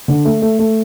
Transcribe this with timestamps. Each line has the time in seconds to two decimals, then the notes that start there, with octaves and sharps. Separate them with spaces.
0.08 D3
0.25 A3
0.42 A3
0.59 A3